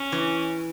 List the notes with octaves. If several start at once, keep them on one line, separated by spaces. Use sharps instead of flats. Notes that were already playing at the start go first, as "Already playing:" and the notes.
Already playing: C#4
E3